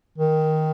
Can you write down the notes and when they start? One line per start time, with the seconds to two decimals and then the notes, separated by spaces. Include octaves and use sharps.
0.18 D#3